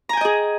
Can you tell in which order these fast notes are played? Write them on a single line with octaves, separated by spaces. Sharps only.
A#5 G#5 G5 D#5 G#4